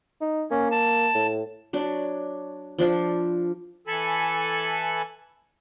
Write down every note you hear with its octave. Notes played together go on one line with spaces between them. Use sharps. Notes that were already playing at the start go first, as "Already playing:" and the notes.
D#4
A#3 C#4
A5
A2
F#3 D4
F3 D4 F4
E3 A4 G#5 A5 B5